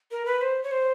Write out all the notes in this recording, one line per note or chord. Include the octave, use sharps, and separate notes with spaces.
A#4
B4
C5
C#5
C5